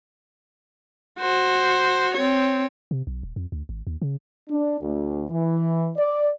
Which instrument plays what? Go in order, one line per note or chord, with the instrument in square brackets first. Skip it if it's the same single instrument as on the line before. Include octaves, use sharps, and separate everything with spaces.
[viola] F#4 C5
C4 C#5
[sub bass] C3
B1
D#1
F2
D2
G#1
D#2
C#3
[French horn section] D4
D2
E3
D5